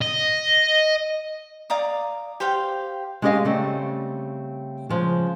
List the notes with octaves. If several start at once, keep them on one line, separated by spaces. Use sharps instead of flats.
D#5
D5 F5 A#5 D#6
G4 C5 F5 G5
G#3 C#4 G4 G#4 D#5 F5
C#3 G3 A3 C4
C#3 F3 G#3